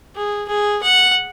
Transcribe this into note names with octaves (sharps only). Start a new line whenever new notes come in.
G#4
G#4
F#5